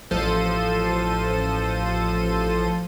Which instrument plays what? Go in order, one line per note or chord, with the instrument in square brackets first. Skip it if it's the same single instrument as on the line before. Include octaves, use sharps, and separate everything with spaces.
[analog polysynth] A1 F3 A4 C5 D#7